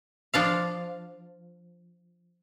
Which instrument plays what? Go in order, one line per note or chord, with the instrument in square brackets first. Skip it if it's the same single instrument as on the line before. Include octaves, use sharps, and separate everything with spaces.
[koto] F3 D4 F5